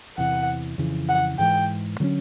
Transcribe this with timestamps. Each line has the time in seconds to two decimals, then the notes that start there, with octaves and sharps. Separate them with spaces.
0.18 E2 C3 E3 F#5
0.78 F2 C#3 E3
1.09 F#5
1.39 G#2 E3 G#3 G5
2.00 D3 F#3 A3 C#4